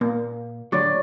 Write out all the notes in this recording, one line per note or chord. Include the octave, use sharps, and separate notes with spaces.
A#2 A#3
A2 D3 F#3 C#5 D5